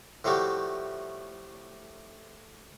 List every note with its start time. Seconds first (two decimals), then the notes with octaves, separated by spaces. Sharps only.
0.24 A2 F3 G3 A3 F#4 G4